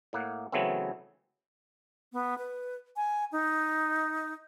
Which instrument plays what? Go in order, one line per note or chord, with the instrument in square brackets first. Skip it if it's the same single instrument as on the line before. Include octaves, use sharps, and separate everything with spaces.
[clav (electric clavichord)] A2 A#3 F#5
C#3 E3 F#3 A3 B3 C4
[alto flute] B3
B4
G#5
D#4